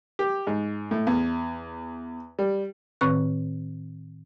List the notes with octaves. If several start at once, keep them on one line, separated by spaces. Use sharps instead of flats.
G4
G#2
A2
E2
G3
A2 D#3 C4 B4 C#6 F#6